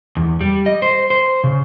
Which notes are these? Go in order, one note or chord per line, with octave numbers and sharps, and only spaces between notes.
E2
G3
D#5
C5
C5
C#3